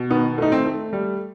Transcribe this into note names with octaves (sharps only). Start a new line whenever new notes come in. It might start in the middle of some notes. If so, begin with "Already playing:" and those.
Already playing: B2
D#3 B3
A3 D#4
C4
A3
G3